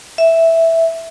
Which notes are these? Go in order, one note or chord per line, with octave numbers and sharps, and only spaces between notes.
E5